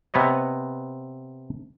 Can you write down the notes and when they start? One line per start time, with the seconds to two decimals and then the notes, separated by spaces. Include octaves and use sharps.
0.14 C3 B3 B4 C#5 D#5